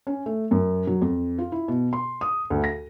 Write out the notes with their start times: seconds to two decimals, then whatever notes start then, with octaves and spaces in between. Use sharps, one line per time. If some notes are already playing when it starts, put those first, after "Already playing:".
0.07 C#4
0.26 A3
0.51 F#2
0.87 F#3
1.02 F2
1.38 F4
1.52 E4
1.68 B2
1.93 C6
2.21 D#6
2.50 D2
2.64 A#6